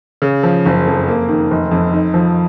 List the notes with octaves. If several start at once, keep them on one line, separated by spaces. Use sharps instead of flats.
C#3
F3
F#1
F2
A#3
D#3
F1
F2
D#4
F3